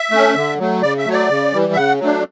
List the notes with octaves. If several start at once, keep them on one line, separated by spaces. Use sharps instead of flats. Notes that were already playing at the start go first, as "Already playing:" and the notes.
Already playing: E5
A3 C#4
D3
F#3 A3
C#3 D5
E5
F#3 A3 C#5
D5
C#3
E3 G3
E5
C#3 F#5
F#3 A3 D4